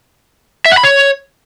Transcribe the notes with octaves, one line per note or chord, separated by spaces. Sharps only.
E5
F#5
B5
C#5